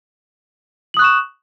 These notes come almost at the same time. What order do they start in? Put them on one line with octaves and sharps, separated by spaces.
F#7 D#6 F#6 C#6 E7